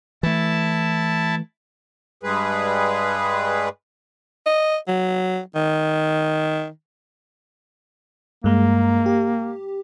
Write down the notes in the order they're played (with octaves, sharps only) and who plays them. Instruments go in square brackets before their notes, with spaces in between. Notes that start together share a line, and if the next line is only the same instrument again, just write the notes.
[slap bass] E3 A3 [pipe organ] E4 A5
[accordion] G2 G3 G#3 G#4 B4
[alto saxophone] D#5
F#3
D#3
[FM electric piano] G2 G#3 A#5 [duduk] A#3
[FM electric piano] G4